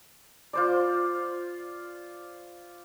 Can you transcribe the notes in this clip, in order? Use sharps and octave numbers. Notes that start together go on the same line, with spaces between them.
F4 C5 D5